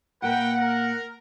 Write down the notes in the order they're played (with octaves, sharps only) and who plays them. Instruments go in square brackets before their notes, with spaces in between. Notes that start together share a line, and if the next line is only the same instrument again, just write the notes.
[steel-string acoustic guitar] A#2 A#3 [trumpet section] A#4 B4 G5 [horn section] F#5
[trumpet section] A#4